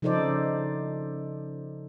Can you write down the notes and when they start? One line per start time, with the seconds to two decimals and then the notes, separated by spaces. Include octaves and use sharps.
0.02 C#3 F3 D#4 A4 C5 D5